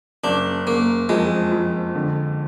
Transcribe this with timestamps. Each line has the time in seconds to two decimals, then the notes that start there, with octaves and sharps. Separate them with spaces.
0.24 F#1 D4
0.66 F#1 A#3
1.09 F2 G#3
1.52 F2
1.95 D3